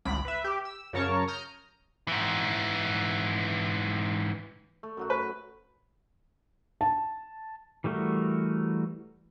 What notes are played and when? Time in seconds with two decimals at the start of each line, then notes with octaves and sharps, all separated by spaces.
0.05 G#1 C#2 B5 A#6 B6 D7
0.25 B4 E5
0.44 G4
0.65 E6
0.93 F#2 C#3 A#4 C#5 A5 C#6
1.28 A#5 D#6 F6 G6
2.08 G#2 E3
4.83 A3
4.97 F#2 F#3 F#4
5.10 B4
6.81 A5
7.84 E3 G3 A3 F#4 A#4